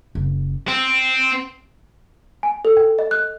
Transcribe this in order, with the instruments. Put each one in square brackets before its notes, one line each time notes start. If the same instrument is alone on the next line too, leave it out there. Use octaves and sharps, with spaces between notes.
[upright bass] F#1
[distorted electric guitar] C4
[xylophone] G#5
A4
G5
D#5
F#6